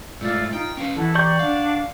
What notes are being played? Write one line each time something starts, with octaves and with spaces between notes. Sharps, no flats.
G#2 A3 F4 D5 E6
D#4 F4 G5
C#4 B4 F5
E3 E4 F#4 A4
G4 D5 A#5 C6 C#6 G6
D4 F5 F#5